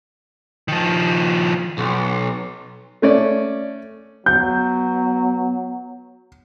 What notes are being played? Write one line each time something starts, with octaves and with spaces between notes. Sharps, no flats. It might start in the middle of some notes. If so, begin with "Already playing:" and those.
D#3 F3
B1
A3 C#4 D5
F#3 B3 G6